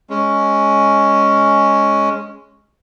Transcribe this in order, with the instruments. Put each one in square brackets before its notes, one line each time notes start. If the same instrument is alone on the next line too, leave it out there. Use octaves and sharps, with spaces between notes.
[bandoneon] G#3 C#4